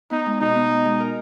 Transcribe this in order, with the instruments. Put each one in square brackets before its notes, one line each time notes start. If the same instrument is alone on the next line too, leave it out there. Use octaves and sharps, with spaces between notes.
[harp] B3 [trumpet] D#4
[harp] G#3
[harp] B2 [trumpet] D#4
[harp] B3
G#3
G#3
A#4